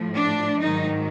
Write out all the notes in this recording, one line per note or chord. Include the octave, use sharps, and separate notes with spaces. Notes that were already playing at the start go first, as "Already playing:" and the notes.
Already playing: A2 F3
D4
G#2 D#3 F#3 D#4